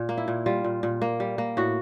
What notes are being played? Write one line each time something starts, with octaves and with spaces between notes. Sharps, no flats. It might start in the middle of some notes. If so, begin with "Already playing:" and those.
Already playing: A#2
A#3
E4
A#2
G3 F4
A#2
A#2
A#3
G3
A#3
A2 F#4